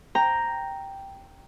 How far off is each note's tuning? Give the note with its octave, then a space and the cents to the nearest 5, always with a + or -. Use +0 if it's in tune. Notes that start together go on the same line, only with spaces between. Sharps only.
G5 +0 A#5 +0